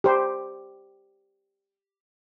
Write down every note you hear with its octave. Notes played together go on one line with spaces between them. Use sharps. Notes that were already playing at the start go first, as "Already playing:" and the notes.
G4 C5